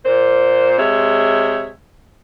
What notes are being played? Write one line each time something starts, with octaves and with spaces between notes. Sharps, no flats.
A#2 C5
C3 G#3 C#5 E5